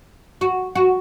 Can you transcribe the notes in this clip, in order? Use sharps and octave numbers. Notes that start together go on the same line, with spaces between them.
F#4
F#4